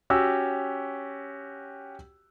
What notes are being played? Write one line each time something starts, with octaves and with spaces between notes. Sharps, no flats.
C#4 F#4 G4 E6